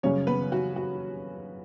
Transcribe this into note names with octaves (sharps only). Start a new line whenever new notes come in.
F#2 C#3 G3 C#4 C#5
B3 B4
F#4
F#4